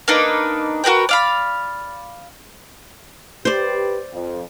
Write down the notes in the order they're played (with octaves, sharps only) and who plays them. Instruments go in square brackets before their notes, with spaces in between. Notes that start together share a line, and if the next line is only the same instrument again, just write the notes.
[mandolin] A#3 D4 D#4 B4
F#4 A#4 B4 G5
D5 F5 B5
[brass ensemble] G4 B4 [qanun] C5 D5
[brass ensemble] F2